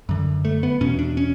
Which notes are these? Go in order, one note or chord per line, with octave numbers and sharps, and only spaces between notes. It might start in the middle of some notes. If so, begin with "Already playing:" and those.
F#2 D3
A3
B3
E2 B2 C#4
D4
C#4